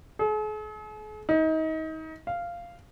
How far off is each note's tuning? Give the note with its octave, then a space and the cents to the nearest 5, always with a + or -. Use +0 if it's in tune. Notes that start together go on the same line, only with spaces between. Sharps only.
G#4 +45
D#4 +30
F5 -10